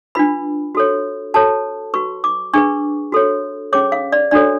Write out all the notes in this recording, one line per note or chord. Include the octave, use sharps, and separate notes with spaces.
D4 F4 B4 B5
F#4 A4 C#5
F#4 A4 C#5 A5
F#4 B4 C#6
D6
D4 G#4 B4 C#6
F#4 A4 C#5
C#4 G#4 C#5 D6
F5
D5
D4 F#4 A4 C#5 D5